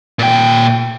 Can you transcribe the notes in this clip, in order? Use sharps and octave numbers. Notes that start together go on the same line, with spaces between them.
A#2 G5